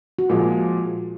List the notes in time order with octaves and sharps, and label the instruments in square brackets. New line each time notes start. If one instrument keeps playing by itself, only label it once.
[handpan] F#4
[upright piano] A#2 F3 G#3 [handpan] F4